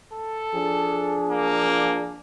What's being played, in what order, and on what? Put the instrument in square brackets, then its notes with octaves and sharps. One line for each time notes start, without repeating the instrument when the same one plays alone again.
[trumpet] A4
[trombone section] F3 D4 G#4
[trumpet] A#3